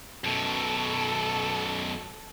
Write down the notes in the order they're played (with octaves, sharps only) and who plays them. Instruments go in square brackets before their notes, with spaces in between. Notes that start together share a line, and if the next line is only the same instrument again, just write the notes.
[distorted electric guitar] F#2 B2 [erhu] A4